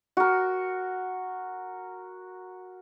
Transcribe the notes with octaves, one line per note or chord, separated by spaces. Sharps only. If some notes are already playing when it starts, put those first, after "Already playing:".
F#4 A#4